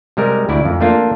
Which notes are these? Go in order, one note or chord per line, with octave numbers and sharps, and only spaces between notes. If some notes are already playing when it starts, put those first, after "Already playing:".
C3 G3 G#3 A#4
D2 E4 D5
F2
A3 A#3 D4 F4